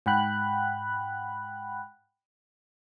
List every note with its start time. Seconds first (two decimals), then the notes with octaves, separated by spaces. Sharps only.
0.06 G#2 F#5 G5 B5 F#6